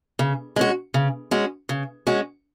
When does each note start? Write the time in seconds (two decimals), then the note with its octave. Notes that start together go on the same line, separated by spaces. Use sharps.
0.19 C#3
0.56 G#3 C#4 F#4
0.94 C#3
1.31 G#3 C#4 F#4
1.69 C#3
2.07 G#3 C#4 F#4